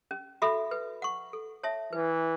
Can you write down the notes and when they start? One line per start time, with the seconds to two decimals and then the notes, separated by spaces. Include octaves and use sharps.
0.11 C#4
0.42 F#4 A4 E5 B5
0.71 B4
1.02 F#5 C#6
1.33 A4
1.63 C#5 E5 A5
1.93 E3 B4